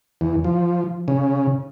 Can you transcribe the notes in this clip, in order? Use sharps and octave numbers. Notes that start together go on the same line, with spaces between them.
E2
F3
C#3